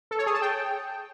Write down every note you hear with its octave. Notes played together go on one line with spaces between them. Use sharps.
A4
C#5
G#4
A5
G5